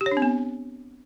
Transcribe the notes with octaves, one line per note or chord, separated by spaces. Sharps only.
G4
C#5
D4
C4
B3